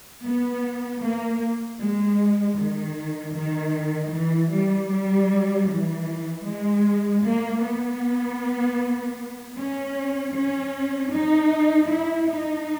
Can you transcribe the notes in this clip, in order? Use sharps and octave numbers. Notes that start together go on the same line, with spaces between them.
B3
A#3
G#3
D#3
D#3
E3
G3
G3
E3
G#3
A#3
B3
C#4
C#4
D#4
E4
D#4